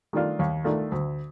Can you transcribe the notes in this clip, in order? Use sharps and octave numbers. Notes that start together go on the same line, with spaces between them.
D#3 A3 D4 F4
D#2
D#3 A3 D4 F4
D2